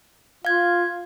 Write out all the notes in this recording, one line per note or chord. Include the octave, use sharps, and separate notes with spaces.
F4 F5 G#6